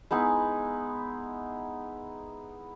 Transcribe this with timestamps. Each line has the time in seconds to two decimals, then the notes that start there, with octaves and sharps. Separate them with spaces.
0.11 G#3 B3 D#4 E4